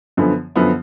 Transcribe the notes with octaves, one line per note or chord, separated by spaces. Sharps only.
F#2 D3 F3 B3
F#2 D3 F3 B3